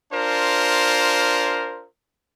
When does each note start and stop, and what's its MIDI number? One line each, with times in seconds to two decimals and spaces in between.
0.12 1.85 62
0.12 1.85 65
0.12 1.85 70
0.12 1.85 72